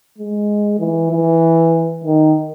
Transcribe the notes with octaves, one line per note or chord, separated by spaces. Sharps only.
G#3
E3
E3
D#3